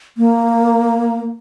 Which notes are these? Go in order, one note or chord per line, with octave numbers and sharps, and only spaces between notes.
A#3